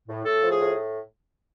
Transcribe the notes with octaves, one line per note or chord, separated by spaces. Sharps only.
A2
A2 A4
F3
G#4
A2